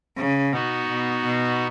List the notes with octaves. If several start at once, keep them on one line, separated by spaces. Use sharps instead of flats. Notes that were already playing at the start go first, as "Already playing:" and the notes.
C#3
B2 B3 D#4 F#4
B2
B2